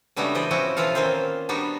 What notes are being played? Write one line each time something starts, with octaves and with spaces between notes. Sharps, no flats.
C#3 G3 A3 B3 D4 F#4
C#3 E3 C5 D5 D#5
A2 F3 C4 C#4 E4 F#4
B2 E3 F3 F4 A4 F5
D#3 A#3 C4 C#4 C5
G3 B3 D4 D#4 F#4